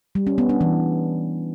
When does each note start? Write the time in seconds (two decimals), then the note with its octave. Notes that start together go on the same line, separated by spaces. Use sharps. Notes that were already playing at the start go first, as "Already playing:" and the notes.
0.15 G3
0.27 C#4
0.38 B3
0.49 D4
0.61 E3